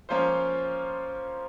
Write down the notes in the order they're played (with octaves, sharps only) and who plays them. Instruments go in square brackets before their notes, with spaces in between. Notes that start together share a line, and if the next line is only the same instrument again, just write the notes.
[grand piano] F3 A#3 C#4 F4 C5